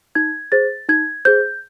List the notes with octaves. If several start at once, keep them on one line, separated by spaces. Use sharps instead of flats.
D#4 G#6
G#4 C5 A6
D#4 G#6
G#4 C5 G6